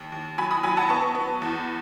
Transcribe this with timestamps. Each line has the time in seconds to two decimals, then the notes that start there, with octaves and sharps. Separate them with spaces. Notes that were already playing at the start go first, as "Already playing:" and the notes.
Already playing: D#2
0.12 D#2
0.38 F#3 G#5 B5
0.51 B5 D#6
0.63 F#3 G#5 B5
0.77 F#5 A5
0.89 B3 A5 C#6
1.15 B3
1.42 E2